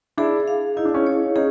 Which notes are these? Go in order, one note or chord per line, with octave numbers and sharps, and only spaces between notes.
D4 E4 G#4
F5
D#4 E4
D4
C#4 D#4
C#5
C#4 D#4 G#4